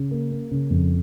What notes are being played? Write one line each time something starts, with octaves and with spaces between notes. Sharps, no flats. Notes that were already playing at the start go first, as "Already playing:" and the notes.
Already playing: C#3
A#3
A#3
C#3
F2